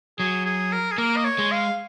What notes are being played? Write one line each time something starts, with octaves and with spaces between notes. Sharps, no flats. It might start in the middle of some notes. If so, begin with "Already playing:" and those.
F#3 G#4
G#4
A#4
G#4
A#3 A#4
D#5
C#5
G#3
F5